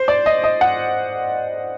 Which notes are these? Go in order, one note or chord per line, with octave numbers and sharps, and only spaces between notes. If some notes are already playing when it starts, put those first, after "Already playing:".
Already playing: C5
D5
D#5
D#5
F#5